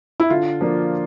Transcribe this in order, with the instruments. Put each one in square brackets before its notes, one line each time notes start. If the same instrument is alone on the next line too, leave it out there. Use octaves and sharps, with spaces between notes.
[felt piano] E4
[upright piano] D3 [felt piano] F4
[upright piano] F3 A#3 D4